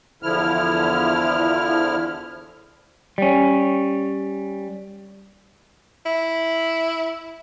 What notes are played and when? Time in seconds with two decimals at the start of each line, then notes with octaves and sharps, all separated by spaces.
0.23 E2 D3 F3 E4 F6
3.18 G3 C#4
6.06 E4